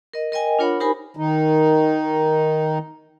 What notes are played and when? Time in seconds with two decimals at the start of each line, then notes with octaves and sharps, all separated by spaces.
0.14 A#4 D#5
0.32 A#4 D#5 G5 G#5
0.59 D4 F4 A#4 C#5 F#5 B5
0.80 D#4 G4 A#4 C5 G#5 B5
1.17 D#3 D#4